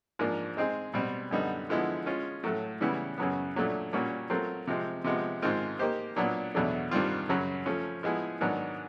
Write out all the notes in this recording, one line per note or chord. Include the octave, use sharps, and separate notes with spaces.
G#2 F3 A#3 D4
G#3 C4 D#4 G#4
B2 G3 C4
F#2 D3 G3 B3 D#4
D3 F3 G#3 B3 E4
G#3 C#4 F4
A2 F#3 A3
C#3 E3 G3 B3 E4
F#2 C#3 F#3 B3
A#2 F#3 A3 D4
A#2 G3 A#3 C#4 F#4
F#3 A3 C4 F4 A#4
C3 F3 G#3 C4
C3 F3 G#3 B3
G#2 D#3 G#3 C4 F4
A#3 D#4 G4 C5
A#2 F#3 B3 D4
E2 B2 F#3 A3 D4
G2 D#3 G3 C4 F4
F#2 C#3 F#3
F3 A3 C#4
F3 G#3 B3 E4 G#4
G#2 D#3 F#3 B3 D4